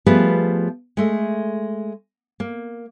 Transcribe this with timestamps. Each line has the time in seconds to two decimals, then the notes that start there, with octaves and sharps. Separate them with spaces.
0.06 F3 G3 A3 B3 G#4 B4
0.97 G#3 A3
2.40 A#3